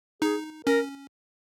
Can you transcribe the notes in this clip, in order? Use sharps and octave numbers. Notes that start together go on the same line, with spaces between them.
D#4 G#4
C#4 A#4